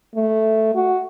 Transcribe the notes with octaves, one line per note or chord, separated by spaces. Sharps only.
A3
F#4